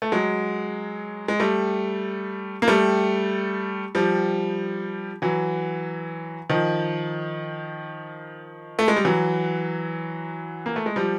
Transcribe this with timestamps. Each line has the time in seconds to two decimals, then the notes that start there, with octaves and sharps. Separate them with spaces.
0.02 A3
0.12 F#3 G#3
1.28 G#3
1.40 G3 A3
2.62 A#3
2.68 G3 A3
3.95 F3 G3
5.22 E3 F#3
6.50 D#3 F3
8.79 A3
8.88 G#3
8.96 G3
9.05 E3 F#3
10.66 A#3
10.76 A3
10.86 G#3
10.96 F3 G3